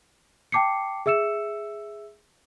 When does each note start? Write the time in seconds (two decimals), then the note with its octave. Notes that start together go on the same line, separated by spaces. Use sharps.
0.52 G5 A5 D6 C7 C#7
1.06 G#4 E5 E6 C#7 E7